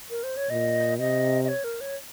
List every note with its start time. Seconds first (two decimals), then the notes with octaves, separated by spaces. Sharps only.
0.10 A#4
0.23 C5
0.37 C#5
0.50 A#2 D#5
0.99 C3 D#5
1.44 D#5
1.49 C#5
1.64 A#4
1.81 C#5